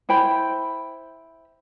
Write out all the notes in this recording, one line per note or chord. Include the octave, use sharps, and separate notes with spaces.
E4 C5 G5 B5